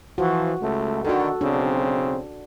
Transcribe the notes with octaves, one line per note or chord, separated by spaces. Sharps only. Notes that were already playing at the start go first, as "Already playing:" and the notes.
E3 F3 F#4
C#2 A3
D3 D#3 F#4 A4
B1 C#3 C4 D4